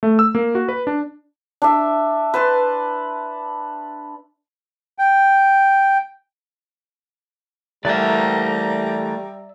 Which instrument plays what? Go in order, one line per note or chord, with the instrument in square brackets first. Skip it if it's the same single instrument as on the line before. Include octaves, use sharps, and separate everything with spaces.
[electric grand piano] A3
E6
A#3
F#4
B4
D4
[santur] D4 E5
B4 A5 C6
[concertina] G5
[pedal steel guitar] E3 A3 A#3 [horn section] G3 A#5 [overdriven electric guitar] D5 E5